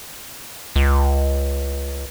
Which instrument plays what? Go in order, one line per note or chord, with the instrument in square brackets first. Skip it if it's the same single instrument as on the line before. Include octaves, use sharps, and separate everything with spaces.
[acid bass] C#2